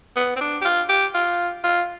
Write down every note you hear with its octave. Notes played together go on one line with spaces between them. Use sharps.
B3
C4
D4
G4
F4
G4
F4
F4